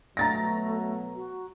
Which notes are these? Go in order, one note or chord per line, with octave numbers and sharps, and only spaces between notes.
B2 F#3 A3 A#5 A6 A#6
F#4